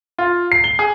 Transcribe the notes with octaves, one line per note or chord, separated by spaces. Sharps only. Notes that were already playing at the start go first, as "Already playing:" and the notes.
F4
C7
G7
G#4